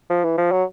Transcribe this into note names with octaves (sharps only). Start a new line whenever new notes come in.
F3
E3
F3
F#3